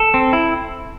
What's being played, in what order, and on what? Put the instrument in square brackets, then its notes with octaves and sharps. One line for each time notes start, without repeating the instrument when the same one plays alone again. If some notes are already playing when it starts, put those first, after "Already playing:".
Already playing: [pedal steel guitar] A4
C4
E4